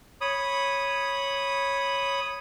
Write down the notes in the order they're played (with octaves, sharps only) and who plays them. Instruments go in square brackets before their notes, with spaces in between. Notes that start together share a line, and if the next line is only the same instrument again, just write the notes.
[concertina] C#5 B5 D#6